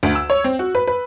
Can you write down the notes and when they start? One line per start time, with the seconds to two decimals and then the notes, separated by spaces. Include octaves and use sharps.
0.03 D2
0.15 E6
0.30 C#5
0.44 C4
0.59 F#4
0.75 B4
0.87 B4